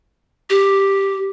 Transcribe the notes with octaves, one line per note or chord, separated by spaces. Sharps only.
G4